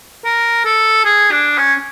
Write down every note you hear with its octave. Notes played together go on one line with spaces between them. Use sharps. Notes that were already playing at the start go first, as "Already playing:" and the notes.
A#4
A4
G#4
D4
C#4